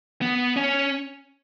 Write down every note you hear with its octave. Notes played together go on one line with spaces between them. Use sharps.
B3
C#4